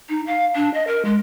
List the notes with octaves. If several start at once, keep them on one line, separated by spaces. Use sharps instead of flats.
D#4
F5
D4
D#5
A#4
G#3